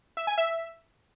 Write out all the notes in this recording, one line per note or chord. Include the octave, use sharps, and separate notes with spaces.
E5
G#5
E5